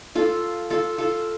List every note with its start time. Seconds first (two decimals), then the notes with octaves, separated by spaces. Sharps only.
0.15 F4 A4
0.70 F4 A4
0.98 F4 A4